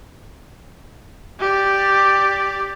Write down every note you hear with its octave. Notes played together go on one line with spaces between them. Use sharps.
G4 D5